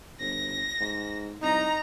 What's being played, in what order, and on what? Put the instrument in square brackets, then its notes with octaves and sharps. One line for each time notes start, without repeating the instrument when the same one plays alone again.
[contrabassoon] G1 [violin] A#6
[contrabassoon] G#2
[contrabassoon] C2 [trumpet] D#4 [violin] A#5